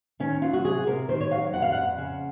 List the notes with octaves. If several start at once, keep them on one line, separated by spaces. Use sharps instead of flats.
D#3 C#4
F#3 F4
F#4
C3 G#4
C3 A#4
D#3 C5
C#5
F#3 F5
F2 F#5
F5
F2 F#5
C#3